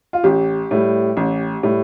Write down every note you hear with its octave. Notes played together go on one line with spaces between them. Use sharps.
F4
A1 G4
A2 G3
A1
A2 G3